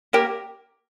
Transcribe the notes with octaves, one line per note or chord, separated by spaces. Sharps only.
A#3 G4 A#4